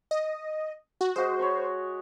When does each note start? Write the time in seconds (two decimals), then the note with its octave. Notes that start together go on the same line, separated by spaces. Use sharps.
0.11 D#5
1.01 F#4
1.16 G#3 F#4 C5 D#5
1.39 C#5 B5 C#6